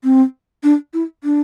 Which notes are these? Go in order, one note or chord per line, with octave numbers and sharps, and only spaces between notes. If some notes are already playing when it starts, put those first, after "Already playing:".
C4
D4
E4
D4